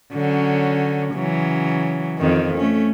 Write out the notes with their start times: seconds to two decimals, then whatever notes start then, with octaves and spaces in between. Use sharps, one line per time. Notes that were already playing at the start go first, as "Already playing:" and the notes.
0.13 D3 F#3 C#4
1.14 C#3 E3 F#3
2.19 F2 D#3
2.58 A3 C#4